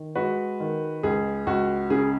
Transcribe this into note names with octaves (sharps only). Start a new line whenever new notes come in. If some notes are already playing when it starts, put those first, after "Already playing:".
Already playing: D#3
G#3 F#4 B4
D#3
C#2 G#4
C#2 F#4
C#3 G#4